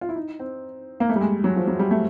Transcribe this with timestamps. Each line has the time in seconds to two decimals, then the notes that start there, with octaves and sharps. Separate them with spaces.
0.01 F4
0.09 E4
0.16 D#4
0.40 C4
1.00 A#3
1.09 A3
1.16 G3
1.21 G#3
1.44 F#3
1.56 F3
1.68 F#3
1.79 G3
1.91 A3